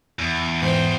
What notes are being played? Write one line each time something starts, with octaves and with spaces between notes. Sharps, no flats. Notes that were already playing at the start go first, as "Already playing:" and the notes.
E2
G#2 E3 C5 G5